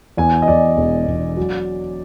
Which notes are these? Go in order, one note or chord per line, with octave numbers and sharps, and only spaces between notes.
E2 G#5
D#5
E2 D5
E1
E1
F#3